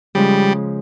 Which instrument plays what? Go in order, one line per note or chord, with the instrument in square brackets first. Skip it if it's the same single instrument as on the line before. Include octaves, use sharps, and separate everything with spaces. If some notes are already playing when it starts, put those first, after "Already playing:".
[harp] C#3 F3 G#3 C#4 [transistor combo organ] G3